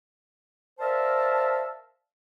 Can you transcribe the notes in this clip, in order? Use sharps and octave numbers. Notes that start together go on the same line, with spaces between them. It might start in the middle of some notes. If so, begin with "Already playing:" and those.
A#4 C5 D5 E5 F5 A5